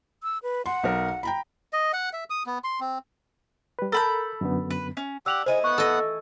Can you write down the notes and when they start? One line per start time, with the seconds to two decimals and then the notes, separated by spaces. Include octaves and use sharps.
0.23 E6
0.43 B4
0.66 F#5 C6
0.84 B1 A#4
1.23 G5 A#5 B5
1.73 D#5
1.93 F#5
2.13 E5
2.30 D#6
2.46 B3
2.64 C6
2.80 C4
3.79 G3 B4
3.92 A4 A#4 B5 G6
4.41 F#2 D3 B3
4.70 B4
4.97 C#4
5.26 D4 G4 F#5 E6 F7 F#7
5.46 A3 D#4 E4 G#4 C5
5.64 B3 F#5 C#6
5.78 E3 A4 D#5